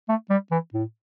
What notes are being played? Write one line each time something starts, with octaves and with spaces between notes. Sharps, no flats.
A3
G3
E3
A2